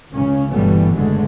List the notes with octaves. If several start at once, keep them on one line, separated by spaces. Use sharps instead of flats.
C#2 C#3 C#4
G1 B2 E3 G3 A3 B3
F#1 A2 D3 G#3 A3